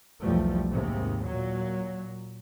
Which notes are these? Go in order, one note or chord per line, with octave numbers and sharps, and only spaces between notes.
B1 E2 F3 G3 A3
D#2 G#2 C3
A#2 F#3